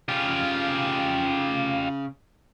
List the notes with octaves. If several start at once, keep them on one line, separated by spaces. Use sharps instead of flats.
C#3 C#4 F4 G4